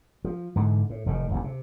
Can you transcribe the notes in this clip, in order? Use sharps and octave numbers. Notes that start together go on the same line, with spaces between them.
F3
G#2 D3 E3
A2
F1 A2 C3 D#3
E1 A1 D2
C3